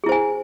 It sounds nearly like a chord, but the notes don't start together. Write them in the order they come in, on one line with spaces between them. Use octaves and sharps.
G#4 E4 C5 G#5